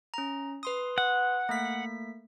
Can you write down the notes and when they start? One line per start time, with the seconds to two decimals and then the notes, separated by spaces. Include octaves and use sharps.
0.14 C#4 A#5
0.63 B4 C6 D#6
0.98 F#5
1.49 A3 A#3 B6